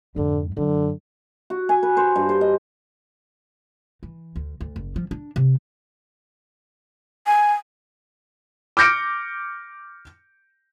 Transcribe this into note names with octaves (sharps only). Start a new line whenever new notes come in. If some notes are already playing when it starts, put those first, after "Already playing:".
F2 G#2 D3
F#2 D3
F#4
G#5
B4
C5
G2
C5
D#5
E3
D2
D2
F#1
F3
D4
C3
G#5
D6 F6 G6 A#6 C#7 D7